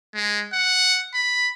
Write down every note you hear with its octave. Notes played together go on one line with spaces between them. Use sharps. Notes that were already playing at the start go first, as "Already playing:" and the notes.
G#3
F#5
B5